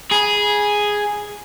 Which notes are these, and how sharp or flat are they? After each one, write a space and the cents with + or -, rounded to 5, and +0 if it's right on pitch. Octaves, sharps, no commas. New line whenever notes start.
G#4 +0 B5 -35